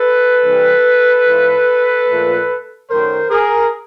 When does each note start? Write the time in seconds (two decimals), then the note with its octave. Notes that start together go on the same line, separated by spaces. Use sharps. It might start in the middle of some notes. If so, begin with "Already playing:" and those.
Already playing: A4 B4
0.42 C3 E3 G3
1.25 A2 F3 A3
2.07 A#2 F3 A3
2.89 F#2 D#3 F#3 A3 A#4 C5
3.30 G#4 A#4